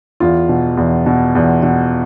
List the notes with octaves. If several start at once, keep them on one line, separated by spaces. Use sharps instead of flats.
E2 F4
B2
E2
B2
E2
B2